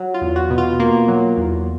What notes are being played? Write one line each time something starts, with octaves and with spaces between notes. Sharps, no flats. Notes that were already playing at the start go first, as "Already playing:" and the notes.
Already playing: F#3
F4
E2
F#4
B2
F4
A#3
F#3
E2